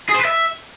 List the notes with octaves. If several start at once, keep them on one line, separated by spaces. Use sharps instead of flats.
G#4
C5
B4
E5